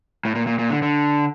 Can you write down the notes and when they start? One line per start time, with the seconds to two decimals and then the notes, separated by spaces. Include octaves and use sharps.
0.25 A2
0.35 A#2
0.47 A#2
0.59 A#2
0.70 D3
0.82 D3